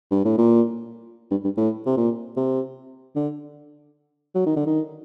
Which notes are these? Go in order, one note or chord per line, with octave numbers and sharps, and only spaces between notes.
G2
A2
A#2
G2
G2
A2
C3
A#2
C3
D3
F#3
D#3
D3
D#3